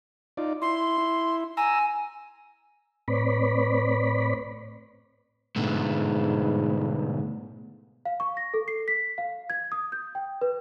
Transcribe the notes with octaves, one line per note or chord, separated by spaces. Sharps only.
D#4 F4 D5
E4 C6
E4
G#5 A#5 E6
A2 C4 B4 C#5 D5 B5
G#2 B2 D3 A3
F5
C#6
A#6
A4
C7
B6
F5
G#6
D#6
G6
G5
B4